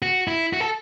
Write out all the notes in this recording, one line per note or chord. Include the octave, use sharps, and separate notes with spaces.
F#4
E4
F#4
A4